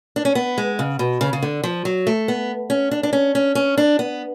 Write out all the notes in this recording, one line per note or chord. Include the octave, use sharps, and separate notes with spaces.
D4
C#4
B3
G#3
C#3
B2
C#3
C#3
D3
F3
F#3
A3
B3
C#4
D4
D4
C#4
C#4
C#4
D4
B3